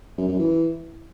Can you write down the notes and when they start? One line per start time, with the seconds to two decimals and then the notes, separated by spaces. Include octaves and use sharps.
0.18 F#2
0.28 F#2
0.39 E3